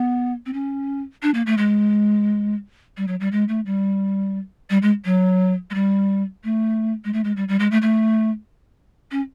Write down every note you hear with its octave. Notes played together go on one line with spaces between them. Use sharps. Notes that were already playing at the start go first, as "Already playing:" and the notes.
Already playing: B3
C4
C#4
D4
A#3
A3
G#3
G3
F#3
G3
G#3
A3
G3
G3
G#3
F#3
G#3
G3
A3
G#3
A3
G#3
G3
G3
G#3
A3
A3
C#4